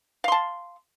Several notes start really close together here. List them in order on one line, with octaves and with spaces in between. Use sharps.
F5 C6 A5